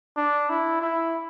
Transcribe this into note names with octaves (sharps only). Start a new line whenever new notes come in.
D4
E4
E4